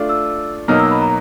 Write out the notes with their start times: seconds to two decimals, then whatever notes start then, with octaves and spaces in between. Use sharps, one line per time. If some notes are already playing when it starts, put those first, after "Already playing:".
Already playing: A3 D4 F4
0.09 E6
0.68 B2 F#3 A#3 D#4 F6
0.80 E6
0.91 B5
1.02 A#5